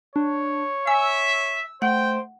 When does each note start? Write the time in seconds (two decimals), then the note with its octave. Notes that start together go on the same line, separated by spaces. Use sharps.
0.16 D4 C#5
0.87 E5 G#5 E6
1.82 A3 C5 F#5 G5